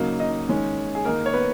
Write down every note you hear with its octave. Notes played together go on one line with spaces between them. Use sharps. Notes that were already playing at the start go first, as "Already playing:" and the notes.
Already playing: C#3 F#3 A#3 D#4
D#4 D#5
D#3 G#3 C#4
G#4
D#3 A#3 D#4 A#4
C#5
B3 B4